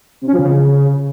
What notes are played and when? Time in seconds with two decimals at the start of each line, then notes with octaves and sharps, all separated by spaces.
0.22 C3
0.27 C#4
0.33 F3
0.38 C#3